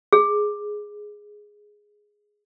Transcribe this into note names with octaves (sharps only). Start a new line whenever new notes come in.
G#4